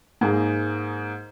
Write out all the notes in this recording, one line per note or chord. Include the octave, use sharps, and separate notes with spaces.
G#2 A#3 G#4